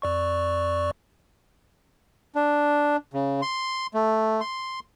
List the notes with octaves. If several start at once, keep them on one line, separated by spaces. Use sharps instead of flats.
F2 D5 C#6
D4
C#3
C6
A3
C6